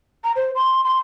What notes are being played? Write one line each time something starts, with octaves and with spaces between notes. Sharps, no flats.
A#5
C5
C6
C6